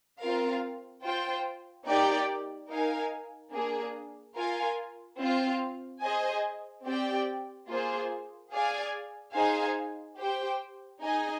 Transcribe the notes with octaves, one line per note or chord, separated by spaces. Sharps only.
C4 F4 A#4 F5
F4 C5 G5
A#3 D#4 G4 D5 G5
D#4 A#4 F5 G#5
A#3 D4 G#4
F4 A#4 F5 G#5
C4 F4 C5 F5
G#4 C5 D#5 G#5
C4 G4 D5 G5
A#3 F4 G#4 C5
G#4 D5 F5 G#5
D#4 G#4 C5 F5 G#5
G4 C5 G5
D#4 G#4 D#5 G#5